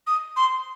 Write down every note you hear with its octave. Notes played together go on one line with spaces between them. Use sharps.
D#6
C6